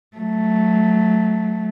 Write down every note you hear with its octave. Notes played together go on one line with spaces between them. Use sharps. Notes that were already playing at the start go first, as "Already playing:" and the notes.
F#3 A3